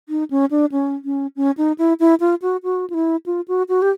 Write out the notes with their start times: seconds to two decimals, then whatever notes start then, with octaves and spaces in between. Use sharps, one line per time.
0.09 D#4
0.31 C#4
0.51 D4
0.72 C#4
1.05 C#4
1.36 C#4
1.57 D#4
1.79 E4
2.00 E4
2.20 F4
2.42 F#4
2.63 F#4
2.90 F4
2.94 E4
3.26 F4
3.48 F#4
3.69 F#4
3.82 G4